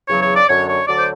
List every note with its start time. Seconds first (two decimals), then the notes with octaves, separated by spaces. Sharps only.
0.08 E2 C#3 F#3 C#5
0.22 C#5
0.35 D5
0.48 F#2 D3 F#3 C#5
0.68 C#5
0.88 D2 D3 F#3 D5
0.98 C5